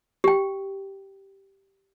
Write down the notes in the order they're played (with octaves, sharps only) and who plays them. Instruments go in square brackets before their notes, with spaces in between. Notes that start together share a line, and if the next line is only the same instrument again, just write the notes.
[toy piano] G4 G5